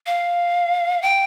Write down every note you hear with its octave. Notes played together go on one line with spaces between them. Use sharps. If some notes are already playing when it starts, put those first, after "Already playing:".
F5
G5